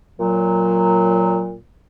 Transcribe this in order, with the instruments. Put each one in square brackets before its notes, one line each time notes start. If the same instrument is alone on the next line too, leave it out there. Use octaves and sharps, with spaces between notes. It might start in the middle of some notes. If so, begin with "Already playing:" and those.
[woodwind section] A#2 F#3